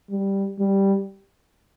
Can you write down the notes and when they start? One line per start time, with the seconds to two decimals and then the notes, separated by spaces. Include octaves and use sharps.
0.11 G3
0.59 G3